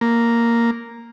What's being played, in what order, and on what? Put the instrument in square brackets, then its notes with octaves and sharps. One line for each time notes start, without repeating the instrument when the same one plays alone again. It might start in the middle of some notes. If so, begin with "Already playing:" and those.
[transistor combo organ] A#3